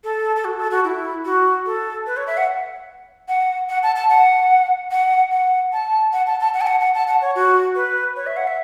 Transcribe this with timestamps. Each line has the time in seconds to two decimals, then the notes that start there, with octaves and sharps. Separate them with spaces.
0.04 A4
0.36 A4
0.45 F#4
0.58 A4
0.71 F#4
0.84 E4
1.25 F#4
1.66 A4
2.06 B4
2.17 C#5
2.27 E5
2.37 F#5
3.28 F#5
3.69 F#5
3.83 A5
3.96 A5
4.09 F#5
4.91 F#5
5.31 F#5
5.73 A5
6.13 F#5
6.27 A5
6.40 A5
6.54 F#5
6.61 A5
6.67 F#5
6.80 F#5
6.94 A5
7.07 F#5
7.22 C#5
7.35 F#4
7.75 B4
8.16 C#5
8.27 E5
8.37 F#5
8.47 E5